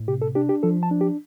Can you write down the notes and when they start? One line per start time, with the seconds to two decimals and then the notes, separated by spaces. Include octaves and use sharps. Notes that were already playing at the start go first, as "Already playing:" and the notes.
Already playing: A2
0.08 C3 G4
0.22 A4
0.35 D4 G4
0.49 G4
0.63 F3 A4
0.83 A5
0.91 D4
1.01 G4